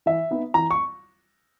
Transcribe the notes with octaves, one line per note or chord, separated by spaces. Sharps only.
E3 E5
B3 D#4
E3 A#5
C#6